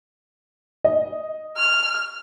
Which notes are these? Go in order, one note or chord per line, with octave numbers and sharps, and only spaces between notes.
D#5
F6